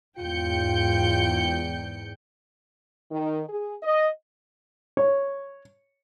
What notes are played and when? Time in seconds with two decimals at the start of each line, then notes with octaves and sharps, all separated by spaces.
0.18 E2 G#2 F4 G5 G6 C#7
3.11 D#3
3.49 G#4
3.83 D#5
4.97 C#5